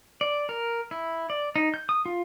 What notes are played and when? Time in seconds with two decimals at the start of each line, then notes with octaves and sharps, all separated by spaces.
0.21 D5
0.49 A#4
0.91 E4
1.30 D5
1.56 D#4
1.74 G6
1.89 D#6
2.06 F4